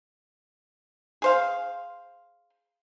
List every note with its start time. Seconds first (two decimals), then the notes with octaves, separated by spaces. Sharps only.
1.22 G#4 C5 F5